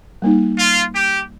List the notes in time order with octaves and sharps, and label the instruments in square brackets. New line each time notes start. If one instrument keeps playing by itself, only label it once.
[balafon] G3 A#3 D#4
[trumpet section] F4
G4